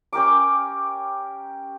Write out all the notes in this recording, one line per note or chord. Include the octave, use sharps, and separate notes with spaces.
C#4 G4 A#4 D6